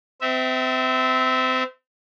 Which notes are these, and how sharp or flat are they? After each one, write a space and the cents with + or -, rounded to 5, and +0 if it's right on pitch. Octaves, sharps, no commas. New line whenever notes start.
C4 -30 E5 -20